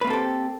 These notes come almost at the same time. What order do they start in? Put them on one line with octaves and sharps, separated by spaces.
B4 A#3 C4 A4 G4